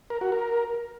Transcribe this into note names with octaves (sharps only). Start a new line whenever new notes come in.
A#4
F#4
A#4